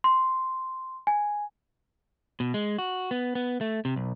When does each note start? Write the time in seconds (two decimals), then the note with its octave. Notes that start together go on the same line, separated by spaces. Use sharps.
0.04 C6
1.07 G#5
2.40 B2
2.54 G#3
2.79 F#4
3.11 B3
3.35 B3
3.61 A3
3.85 C3
3.96 B1